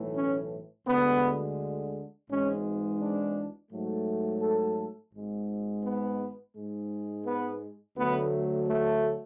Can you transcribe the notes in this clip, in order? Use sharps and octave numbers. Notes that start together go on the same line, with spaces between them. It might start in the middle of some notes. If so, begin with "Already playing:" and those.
Already playing: B1 A2 E3 A3
C#4
D2 D3 G#3 B3
G#1 G#2 E3 G#3 C#4
D4
G#2 F#3 A3
A4
G#1 G#2 G#3
B3
G#2 G#3
B3
D2 D3 F#3 A3 B3
A3